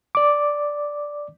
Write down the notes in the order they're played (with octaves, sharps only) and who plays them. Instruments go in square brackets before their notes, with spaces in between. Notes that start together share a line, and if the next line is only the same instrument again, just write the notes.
[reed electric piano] D5 D6